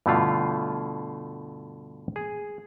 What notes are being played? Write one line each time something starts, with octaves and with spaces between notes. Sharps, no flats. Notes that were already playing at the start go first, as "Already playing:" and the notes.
G2 B2 D3 A3 E4 F4
G#4